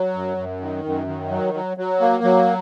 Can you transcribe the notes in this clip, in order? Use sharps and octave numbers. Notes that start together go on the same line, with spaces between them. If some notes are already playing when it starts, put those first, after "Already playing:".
Already playing: F#3
F#2
F#2
D#3
F#2
D#3
F#3
F#3
F#3
A#3
F#3